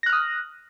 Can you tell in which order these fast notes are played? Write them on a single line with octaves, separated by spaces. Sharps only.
A#6 F#6 F6 D#6